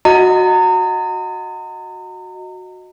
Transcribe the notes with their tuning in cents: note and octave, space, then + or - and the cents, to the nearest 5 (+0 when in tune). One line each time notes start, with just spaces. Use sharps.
F#4 -10 D#5 +0 A#5 -30